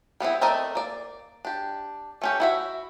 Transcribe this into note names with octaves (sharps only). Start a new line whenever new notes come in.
G3 B3 C4 E4
A3 C4 A#4 D5 D#5
A#3 D5
D4 G4
A3 C#4 G4
E4 F#4 E5